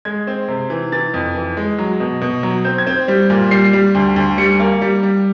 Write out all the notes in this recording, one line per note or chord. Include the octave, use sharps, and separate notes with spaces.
G#3 G#6
C4
C3
E3
E3 A6
F2
E3
G#3
F#3
B2
B2
F#3
C4 G6
G#6
C4
G6
G3
A#2
G3 C7
G3
D2
D2
G3 C#7
A#3
G3
G3